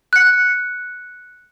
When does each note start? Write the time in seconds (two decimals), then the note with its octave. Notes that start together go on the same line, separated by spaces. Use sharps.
0.13 F#6 C#7